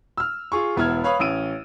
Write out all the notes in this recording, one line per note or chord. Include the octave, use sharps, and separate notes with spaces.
E6 F6
F4 G#4 C#6
E1 B3 E4 F6 G#6
B4 C#5 F5 B5 D#6
A1 C#4 E6 D7 D#7